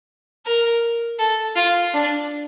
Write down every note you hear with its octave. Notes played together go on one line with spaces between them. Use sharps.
A#4
A4
F4
D4